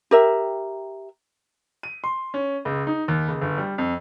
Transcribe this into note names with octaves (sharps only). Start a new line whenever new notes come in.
G4 A#4 E5
D#7
C6
C#4
C#2
D#4
D#2
C#2
G1
G3
F2